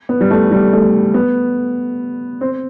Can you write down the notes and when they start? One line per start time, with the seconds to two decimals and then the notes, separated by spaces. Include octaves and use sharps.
0.09 B3
0.21 G3
0.31 A3
0.51 G3
0.73 A3
1.14 B3
2.41 C4